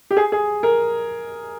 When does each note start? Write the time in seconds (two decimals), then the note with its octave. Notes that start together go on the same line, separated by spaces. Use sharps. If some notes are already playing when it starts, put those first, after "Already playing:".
0.11 G4
0.17 G#4
0.32 G#4
0.63 A#4